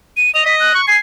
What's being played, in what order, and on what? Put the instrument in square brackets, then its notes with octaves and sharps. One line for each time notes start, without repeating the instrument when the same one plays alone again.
[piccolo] D#7
[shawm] D#5 [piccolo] F7
[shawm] D#5 [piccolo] B6
[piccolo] F#6
[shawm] C#6
[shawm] G#5 [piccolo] C7